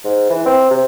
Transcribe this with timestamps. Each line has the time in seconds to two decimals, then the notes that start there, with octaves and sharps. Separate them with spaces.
0.04 G#2
0.30 E3
0.46 C4
0.71 C3